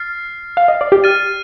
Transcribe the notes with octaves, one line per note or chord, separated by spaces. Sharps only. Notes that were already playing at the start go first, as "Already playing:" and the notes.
Already playing: F6 A6 C7
F5
D#5
D5
G4
F6 A6 D#7